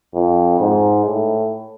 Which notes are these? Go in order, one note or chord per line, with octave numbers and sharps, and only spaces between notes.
F2
G#2
A2